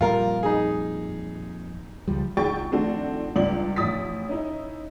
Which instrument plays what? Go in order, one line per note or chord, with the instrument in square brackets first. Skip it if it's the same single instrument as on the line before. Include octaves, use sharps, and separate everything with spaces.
[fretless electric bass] F2 A#2 G3 [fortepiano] F4 A#4
[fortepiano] D#4 G#4
[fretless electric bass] C#2 F3 G3
[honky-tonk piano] C#2 F#4 G#4 G5 C#6 A6
D#3 F3 A3 C4 D4 F#4
C#2 G2 F4 D5 F#7
A1 F2 E4 D#6 A6 B6
C#4 D#4 E4